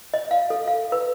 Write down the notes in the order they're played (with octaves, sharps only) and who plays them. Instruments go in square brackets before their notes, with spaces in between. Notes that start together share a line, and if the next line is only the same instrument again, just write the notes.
[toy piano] D#5
F5
A4
F5
B4